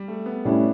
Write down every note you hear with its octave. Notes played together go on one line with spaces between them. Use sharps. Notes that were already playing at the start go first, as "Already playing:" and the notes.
Already playing: G3
A3
B3
A2 G3 C#4 D4 E4